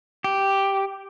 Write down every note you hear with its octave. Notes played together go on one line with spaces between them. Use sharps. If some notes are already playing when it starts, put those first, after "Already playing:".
G4